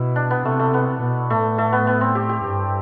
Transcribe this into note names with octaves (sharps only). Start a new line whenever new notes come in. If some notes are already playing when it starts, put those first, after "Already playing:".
Already playing: B2 E4
D4
B3
C3 A3
A3
B3
B2
A2 A3
A3
B3
B3
C4
G4
G4
G2